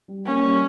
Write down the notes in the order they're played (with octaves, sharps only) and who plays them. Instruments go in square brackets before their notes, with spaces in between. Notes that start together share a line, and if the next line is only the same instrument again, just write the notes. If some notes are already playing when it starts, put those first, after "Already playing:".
[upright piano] G3
[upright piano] A#3 [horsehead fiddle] C#4
[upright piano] G3